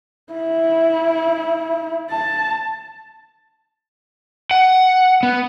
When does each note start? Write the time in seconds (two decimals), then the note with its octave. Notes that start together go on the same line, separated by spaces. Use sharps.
0.33 E4
2.11 A5
4.51 F#5
5.23 B3